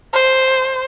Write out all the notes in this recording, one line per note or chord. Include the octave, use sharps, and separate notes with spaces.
C5